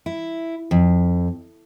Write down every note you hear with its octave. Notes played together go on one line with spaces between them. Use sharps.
E4
F2